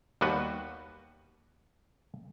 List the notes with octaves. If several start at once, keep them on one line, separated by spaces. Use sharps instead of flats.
D#2 G3 B3 F#4 B4